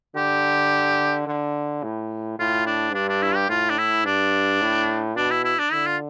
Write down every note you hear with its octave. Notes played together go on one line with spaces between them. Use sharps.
D3 G4
D3
A2
A2 F4
D4
G2 D4
D4
E4
G4
A2 F4
D4
E4
G2 D4
A2
B2 D4
E4
E4
D4
D3 E4
F4